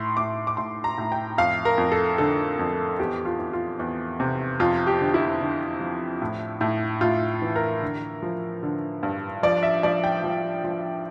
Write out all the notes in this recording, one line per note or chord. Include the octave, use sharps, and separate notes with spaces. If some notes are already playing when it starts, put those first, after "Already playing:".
Already playing: A2 C6
A2 D6
D6
A2 C6
A#5
A2
G5
F2 F5
A#4
F2
A4
D3 A4
F2
E2 G4
F4
E2
F4
E2
C3
F2 F4
G4
D3
E4
D3
F3
A2
A2
A2 F4
E3
A#4
D3
F3
D3
G2
F3 D5
E5
F3 D5
G5
F3
F3